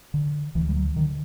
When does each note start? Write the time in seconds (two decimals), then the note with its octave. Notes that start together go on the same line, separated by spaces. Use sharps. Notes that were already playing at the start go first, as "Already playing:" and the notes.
0.14 D3
0.55 D2 E3
0.69 G3
0.76 F#3
0.96 D3 D#3